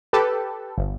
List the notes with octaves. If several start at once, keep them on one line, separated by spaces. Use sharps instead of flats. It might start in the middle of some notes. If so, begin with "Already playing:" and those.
G4 A4 B4
G1